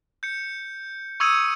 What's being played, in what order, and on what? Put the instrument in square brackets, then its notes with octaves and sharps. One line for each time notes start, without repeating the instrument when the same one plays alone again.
[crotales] G6 C#7
C#6 D#6 E6 G#6 C#7 D#7